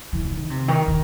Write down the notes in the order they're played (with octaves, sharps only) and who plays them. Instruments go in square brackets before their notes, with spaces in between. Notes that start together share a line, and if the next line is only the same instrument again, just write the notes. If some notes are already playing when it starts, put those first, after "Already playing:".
[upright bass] E3
E3
D#3
C3
D#3
D#3